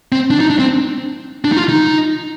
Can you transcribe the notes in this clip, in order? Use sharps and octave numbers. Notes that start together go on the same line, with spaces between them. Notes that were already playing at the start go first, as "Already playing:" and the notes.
C4
D4
D#4
D4
C4
D4
D#4
F4
D#4